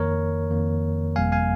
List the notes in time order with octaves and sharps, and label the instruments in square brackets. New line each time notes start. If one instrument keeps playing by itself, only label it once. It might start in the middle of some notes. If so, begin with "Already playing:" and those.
Already playing: [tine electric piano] F2 D#3 A#3 A#4 C#5
F2 D#3 A#3
G1 F2 C3 G3 A#3 F5 G#5
F5 G#5